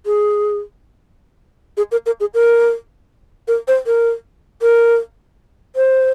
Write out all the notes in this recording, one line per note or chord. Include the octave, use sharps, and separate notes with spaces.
G#4
G#4
A#4
A#4
G#4
A#4
A#4
C5
A#4
A#4
C5